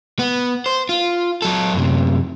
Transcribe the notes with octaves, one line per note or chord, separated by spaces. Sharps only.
B3
C5
F4
F#3 A4
F#2 C3